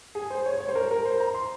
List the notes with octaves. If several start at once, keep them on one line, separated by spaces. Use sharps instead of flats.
G#4
C5
C#5
C#5
C5
A#4
A#4
C5
A#5
C6